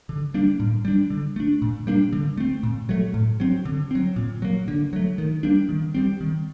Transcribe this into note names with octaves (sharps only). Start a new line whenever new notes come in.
D3
G3 A#3 D4
A2
G3 D4
D3
A3 D4
A#2
G3 A#3 D4
D3
A3 C4
A#2
F#3 A3
A2
F#3 C4
D3
F#3 C4
A#2
F#3 A#3
D3
F#3 A3
D#3
G3 A#3 D4
D#3
G3 C4
D#3